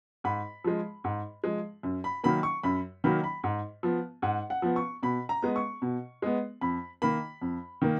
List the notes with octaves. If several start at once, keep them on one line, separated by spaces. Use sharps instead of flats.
G#2 B5
F3 G#3
G#2
F3 G#3
F#2
B5
D#3 F#3 A#3 B5
C#6
F#2 B5
D#3 F#3 A#3 B5
B5
G#2
F3 B3
G#2 F#5
F#5
F3 B3
C#6
B2 B5
A#5
G#3 B3
C#6
B2
G#3 B3
F2 B5
D#3 A#3 B5
F2
D#3 A#3